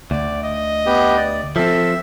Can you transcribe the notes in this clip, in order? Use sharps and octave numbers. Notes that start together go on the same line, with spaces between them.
D2 D5
D#5
B3 G4
D5
F3 C4 A4 E5